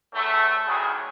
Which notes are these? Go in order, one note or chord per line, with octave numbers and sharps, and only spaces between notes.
E2 A2 A3
D2 A2 D#3 F#3 G#4